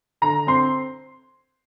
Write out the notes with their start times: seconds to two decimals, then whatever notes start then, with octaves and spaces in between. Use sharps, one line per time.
0.22 D3 A#5
0.47 C4 C6